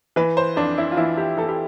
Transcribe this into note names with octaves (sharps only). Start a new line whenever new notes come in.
E3 B4
C5
F2 D4
E4
F4
E3 E4
G4
E3 A4
G4